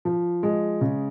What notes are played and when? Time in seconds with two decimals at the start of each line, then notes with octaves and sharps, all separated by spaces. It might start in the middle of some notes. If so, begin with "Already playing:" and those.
0.05 F3
0.43 G#3
0.81 C#3